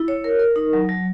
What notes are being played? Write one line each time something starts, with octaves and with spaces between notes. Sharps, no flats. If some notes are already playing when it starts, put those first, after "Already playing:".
Already playing: E4
C#5
A#4
A#4
D#4
F#3
F#3